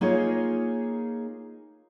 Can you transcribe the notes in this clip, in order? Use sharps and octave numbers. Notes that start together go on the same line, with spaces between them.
A#3 D#4 F4 G#4 C#5